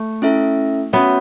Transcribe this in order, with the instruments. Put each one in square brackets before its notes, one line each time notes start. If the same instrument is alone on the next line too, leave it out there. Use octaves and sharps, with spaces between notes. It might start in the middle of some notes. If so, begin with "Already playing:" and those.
Already playing: [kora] A3
[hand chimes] C#4 E4 A4 E5
[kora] B3 [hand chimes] C#4 F#4 C#5 E5